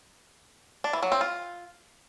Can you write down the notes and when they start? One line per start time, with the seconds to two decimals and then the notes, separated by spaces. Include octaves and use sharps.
0.84 D4
0.93 E3
1.03 F#3
1.12 C4
1.21 F4